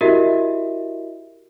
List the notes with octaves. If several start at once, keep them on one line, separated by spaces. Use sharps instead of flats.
E4 F#4 G4 A#4 D#5 E5